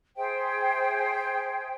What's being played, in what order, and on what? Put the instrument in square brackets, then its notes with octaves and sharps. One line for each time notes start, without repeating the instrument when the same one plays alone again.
[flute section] G#4 C5 E5 G5